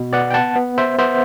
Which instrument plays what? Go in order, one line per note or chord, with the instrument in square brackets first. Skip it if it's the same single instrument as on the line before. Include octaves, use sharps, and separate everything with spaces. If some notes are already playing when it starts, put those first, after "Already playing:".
Already playing: [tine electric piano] B2
B3 D5 F#5
G5
F#5 A5
B3
C5 E5
B3 C5 E5